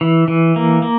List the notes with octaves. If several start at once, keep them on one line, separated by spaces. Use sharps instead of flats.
E3
E3
A#3
A#3